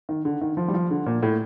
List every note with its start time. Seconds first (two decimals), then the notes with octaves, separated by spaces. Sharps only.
0.09 D#3
0.25 D3
0.41 D#3
0.57 F3
0.68 G3
0.74 F3
0.91 D3
1.06 A#2
1.23 A2